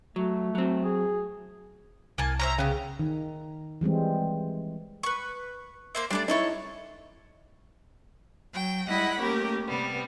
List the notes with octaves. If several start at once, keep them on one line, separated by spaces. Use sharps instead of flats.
F#3 A3
F#3 C4
G#4
C2 A#3 G#5 A5
C#4 C5 E5 A#5
C#3 B3 G4
D#3
E3 G3 G#3 C4
B4 C#6
A#3 C5 E5
G3 A3 D4 A4 D5
A3 D#4 E4 A4 C#5
F#3 G5
G3 G#3 E4 D#5 F#5 B5
A3 A#3 C#4 G4 A#4
C3 G3 B3